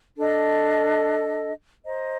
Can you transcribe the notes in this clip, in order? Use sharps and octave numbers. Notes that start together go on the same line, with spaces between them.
D4 A4 D#5
C5 D#5 A#5